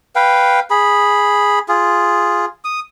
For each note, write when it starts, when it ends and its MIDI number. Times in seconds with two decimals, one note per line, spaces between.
0.16 0.60 71
0.16 0.60 77
0.16 0.60 79
0.70 1.59 68
0.70 1.59 83
1.68 2.46 65
1.68 2.46 68
2.64 2.80 87